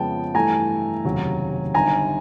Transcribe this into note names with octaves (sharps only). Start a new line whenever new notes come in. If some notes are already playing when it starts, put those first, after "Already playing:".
Already playing: F2 C#3 F3 G#3 B3 G5 A5
G2 E3 A3 G#5 A#5
F1 D#2 C#3 F#3
G1 G2 D#3 G#5 A#5